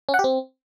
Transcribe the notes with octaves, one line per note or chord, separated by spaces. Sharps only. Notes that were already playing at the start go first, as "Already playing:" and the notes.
C#4
F#5
G4
C4